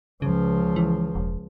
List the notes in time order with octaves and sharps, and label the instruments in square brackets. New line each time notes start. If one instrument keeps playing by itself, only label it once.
[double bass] C#2 F3 [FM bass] C#3
[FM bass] E3
E1